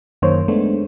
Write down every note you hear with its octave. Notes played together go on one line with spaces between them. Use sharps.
F#2 D#3 A#3 C5 C#5
G#3 A3 B3 D4